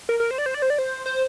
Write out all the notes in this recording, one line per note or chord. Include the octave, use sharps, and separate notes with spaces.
A#4
A#4
C5
D5
C5
D5
C5
D5
C5
C5